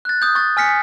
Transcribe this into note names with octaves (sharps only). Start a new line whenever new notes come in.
F#6 A6
D#6 G6
C#6 A6
G#5 F6 B6 C#7